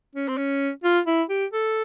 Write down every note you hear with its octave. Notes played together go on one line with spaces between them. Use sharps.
C#4
C4
C#4
F4
E4
G4
A4